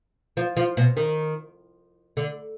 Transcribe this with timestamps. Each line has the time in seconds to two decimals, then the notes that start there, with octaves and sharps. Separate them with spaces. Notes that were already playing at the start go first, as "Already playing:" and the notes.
0.37 F3
0.57 F3
0.77 B2
0.97 D#3
2.17 D3